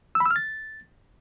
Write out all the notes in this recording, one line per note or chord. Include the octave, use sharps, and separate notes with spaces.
E6
B5
E6
F6
A6